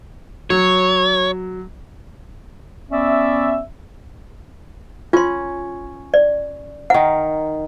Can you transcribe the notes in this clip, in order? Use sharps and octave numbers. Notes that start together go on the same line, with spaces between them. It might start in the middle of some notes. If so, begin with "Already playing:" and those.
F#3 C#5
B3 C#4 D5 E5
C#4 F4 C6
D5
D#3 A#4 F#5